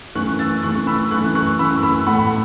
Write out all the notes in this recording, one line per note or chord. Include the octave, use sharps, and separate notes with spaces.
F#2 E3 A3 C#6 F#6
E6 A6
F#2 E3 A3 C#6 F#6
B5 E6
F#2 E3 A3 C#6 F#6
C#6 F#6
F#2 E3 A3 B5 E6
B5 E6
A2 A3 F#5 B5
B5